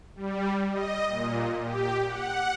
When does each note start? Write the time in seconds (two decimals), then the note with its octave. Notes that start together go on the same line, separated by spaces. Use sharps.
0.16 G3
0.70 D#5
1.08 A#2
1.63 G4
2.07 F#5